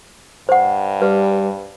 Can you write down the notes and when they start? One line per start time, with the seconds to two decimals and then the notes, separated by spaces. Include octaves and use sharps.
0.49 G2 C5 F#5
1.02 G3 B4